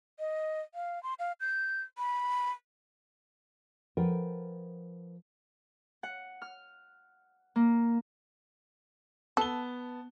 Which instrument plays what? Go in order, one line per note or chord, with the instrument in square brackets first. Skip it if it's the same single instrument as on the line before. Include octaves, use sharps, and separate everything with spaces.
[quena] D#5
F5
C6
F5
G6
B5
[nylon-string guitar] F3 A#4 B4 F#5 G5
[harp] F#5
F6
A#3
[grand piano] B3 A5 G7 [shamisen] A4